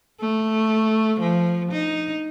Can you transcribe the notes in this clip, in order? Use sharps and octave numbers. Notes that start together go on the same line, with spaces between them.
A3
F3
D#4